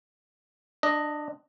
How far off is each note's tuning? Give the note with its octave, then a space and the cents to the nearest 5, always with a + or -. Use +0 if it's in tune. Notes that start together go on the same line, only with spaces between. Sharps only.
D4 +25 D#5 +0